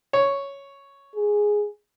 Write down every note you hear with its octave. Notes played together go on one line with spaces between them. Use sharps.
C#5
G#4